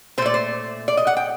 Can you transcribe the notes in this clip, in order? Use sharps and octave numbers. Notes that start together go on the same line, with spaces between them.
A#2 A3 C5 D5
C5
D5
D#5
F#5
G5